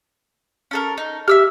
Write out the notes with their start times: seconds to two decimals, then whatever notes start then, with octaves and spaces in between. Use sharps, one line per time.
0.71 C#4 A4 A#4
0.98 D#4
1.28 G4 E5 E6 F6